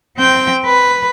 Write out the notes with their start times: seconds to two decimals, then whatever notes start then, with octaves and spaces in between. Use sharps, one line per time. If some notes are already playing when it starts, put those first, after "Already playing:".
0.18 C4 G5
0.66 B4